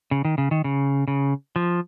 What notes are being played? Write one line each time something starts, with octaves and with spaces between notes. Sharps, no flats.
C#3
D#3
C#3
D#3
C#3
C#3
F3